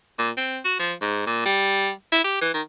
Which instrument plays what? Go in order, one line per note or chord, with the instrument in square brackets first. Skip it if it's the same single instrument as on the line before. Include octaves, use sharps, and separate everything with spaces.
[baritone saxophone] A#2
C4
F#4
F3
G#2
A#2
G3
E4
G4
E3
D#3